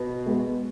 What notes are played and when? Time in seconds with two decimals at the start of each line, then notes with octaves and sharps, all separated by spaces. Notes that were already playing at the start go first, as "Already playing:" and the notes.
Already playing: B2
0.26 G#3 B3